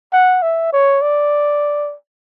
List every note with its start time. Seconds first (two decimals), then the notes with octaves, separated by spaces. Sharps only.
0.13 F#5
0.43 E5
0.73 C#5
1.02 D5